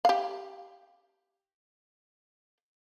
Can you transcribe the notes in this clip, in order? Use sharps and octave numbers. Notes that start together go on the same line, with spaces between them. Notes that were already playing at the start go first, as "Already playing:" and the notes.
G4 F5